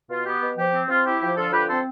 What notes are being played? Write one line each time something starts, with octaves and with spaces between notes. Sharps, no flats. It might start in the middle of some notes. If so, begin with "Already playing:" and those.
B2 F4
B3 G4
B2
F3 G4
C4
C4 F4
E4 G4
F3 G4
D3 F4 A4
F3 G4 B4
C4 A4 C5